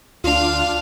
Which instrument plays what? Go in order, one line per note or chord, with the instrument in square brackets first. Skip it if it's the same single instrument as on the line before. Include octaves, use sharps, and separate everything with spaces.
[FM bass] D2 [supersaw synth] D4 F4 [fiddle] F5